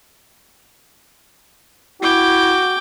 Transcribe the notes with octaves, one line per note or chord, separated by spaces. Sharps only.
E4 F#4 G5 D6